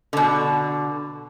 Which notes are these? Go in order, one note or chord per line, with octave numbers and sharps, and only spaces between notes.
B2 D3